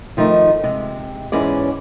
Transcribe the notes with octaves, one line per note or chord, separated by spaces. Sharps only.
D#3 F3 A3 D#4
C3 G#3
E2 G#2 E3 C#4 G#4 D5